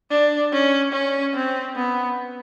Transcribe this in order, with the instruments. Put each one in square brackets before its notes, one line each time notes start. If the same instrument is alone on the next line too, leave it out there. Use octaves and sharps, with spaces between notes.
[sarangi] D4
C#4
C#4
C4
B3